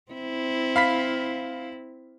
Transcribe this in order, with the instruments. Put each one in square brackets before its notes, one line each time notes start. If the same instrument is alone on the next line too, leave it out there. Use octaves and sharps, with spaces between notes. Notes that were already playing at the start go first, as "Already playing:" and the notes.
[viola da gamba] C4 E4
[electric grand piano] F5 B5 B6